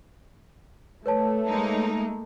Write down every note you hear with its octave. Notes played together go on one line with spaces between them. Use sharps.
A3 B4 C#5 A5
G#3 A#3 D#4